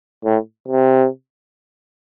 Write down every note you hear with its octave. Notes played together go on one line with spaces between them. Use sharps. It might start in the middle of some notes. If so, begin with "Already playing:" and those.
A2
C3